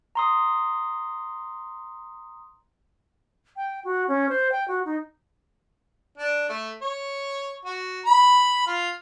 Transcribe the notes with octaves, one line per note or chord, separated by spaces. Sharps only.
A#5 C6 D#6
G5
F#4
C#4
C5
G5
F#4
D#4
D4
A3
C#5
F#4
B5
F4